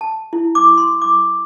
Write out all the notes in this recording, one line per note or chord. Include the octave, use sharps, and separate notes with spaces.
A5
E4
D6
C6
D6